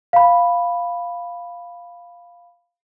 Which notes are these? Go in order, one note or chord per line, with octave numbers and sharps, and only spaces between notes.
F5 B5